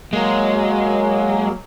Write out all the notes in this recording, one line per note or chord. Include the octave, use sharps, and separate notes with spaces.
F#3 G#3 A#3